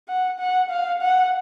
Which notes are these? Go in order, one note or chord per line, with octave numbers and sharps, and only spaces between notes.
F#5
F#5
F5
F#5